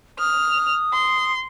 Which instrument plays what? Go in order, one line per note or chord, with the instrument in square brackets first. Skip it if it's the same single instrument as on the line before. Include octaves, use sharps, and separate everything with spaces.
[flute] D#6 [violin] F6
[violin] C6